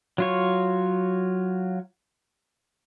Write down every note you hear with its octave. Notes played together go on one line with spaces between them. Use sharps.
F#3 F4 C#5